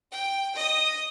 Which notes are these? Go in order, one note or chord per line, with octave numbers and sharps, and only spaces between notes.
G5
D#5 D#6